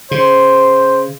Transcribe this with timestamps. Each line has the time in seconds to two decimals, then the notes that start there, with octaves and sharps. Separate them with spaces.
0.11 C#3 C5